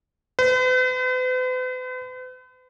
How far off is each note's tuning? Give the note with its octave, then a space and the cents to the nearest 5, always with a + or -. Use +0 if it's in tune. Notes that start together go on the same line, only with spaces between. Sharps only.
B4 +45